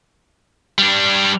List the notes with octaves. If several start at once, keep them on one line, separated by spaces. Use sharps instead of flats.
G3 D4